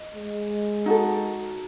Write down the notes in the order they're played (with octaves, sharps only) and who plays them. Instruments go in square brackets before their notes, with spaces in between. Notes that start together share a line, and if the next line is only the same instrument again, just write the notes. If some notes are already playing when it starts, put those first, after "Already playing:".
Already playing: [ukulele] D#5
[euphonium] G#3
[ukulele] D#4 F#4 A4